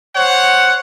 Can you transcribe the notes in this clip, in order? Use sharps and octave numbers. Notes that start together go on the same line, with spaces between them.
C5 C#5 F#5